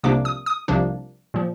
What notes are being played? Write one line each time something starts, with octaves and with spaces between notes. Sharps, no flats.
C2 C3 F3 A#3 D4 D6
D#6
D#6
C2 C3 F3 A#3 D4
A#2 F3